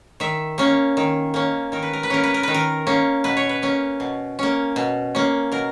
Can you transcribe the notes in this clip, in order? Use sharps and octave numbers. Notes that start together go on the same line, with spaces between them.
D#3 E5
A#3 C#4
D#3
A#3 C#4
D#3 A#4
B4
A#4
B4
A#3 C#4 A#4
B4
A#4
D#3 B4
A#4
A#3 C#4
B2 B4
C#5
B4
A#3 C#4
B2
A#3 C#4
B2
A#3 C#4
B2 A#4